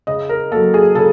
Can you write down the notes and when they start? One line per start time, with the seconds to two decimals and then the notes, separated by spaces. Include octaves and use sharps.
0.07 C#3 D#5
0.29 A#4
0.51 A#3 A4
0.54 F#3
0.74 G#4
0.95 C#3 A4